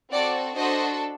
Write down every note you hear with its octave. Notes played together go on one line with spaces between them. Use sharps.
C4 F#4 A4 D5 F#5
D4 F#4 A4 C5 D#5